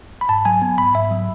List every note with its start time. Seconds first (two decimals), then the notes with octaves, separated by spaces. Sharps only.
0.21 B5
0.29 G#2 A5
0.45 F#3 G#5
0.62 B3
0.78 G#2 B5
0.95 G#2 E5
1.11 F#3